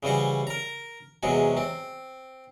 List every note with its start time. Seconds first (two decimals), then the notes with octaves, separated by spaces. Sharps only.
0.03 C#3 E3 G3 F#4 C5
0.47 A#4 A#5
1.23 E2 C3 F#3 G#3 F#4
1.57 C4